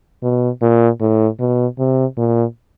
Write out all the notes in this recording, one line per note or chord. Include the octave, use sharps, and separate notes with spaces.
B2
A#2
A2
B2
C3
A#2